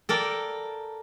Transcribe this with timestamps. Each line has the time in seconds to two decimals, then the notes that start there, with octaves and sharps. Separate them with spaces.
0.09 A4 A#4 D5 G5